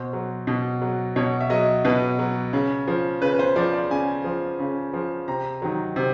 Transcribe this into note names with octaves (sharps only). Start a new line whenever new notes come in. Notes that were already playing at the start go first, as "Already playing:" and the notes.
Already playing: B2 C5
F#3
B2
F#3
B2 C#5
E5
F#3 D#5
B2 B4
F#3
C#3
F3
C#3 B4
B4
C5
F3 D5
D5
C#3 G#5
F3
C#3
F3
C3 A#5
D#3 F#3
C3